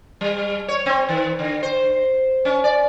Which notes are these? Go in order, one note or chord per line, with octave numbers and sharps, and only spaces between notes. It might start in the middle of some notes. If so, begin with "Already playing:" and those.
G3
C#5
C4
D#3
D3
C5
C#4
D5